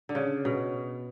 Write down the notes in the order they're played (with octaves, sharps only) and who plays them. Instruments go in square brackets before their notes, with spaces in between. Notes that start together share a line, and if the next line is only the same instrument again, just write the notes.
[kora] D3
C#3
B2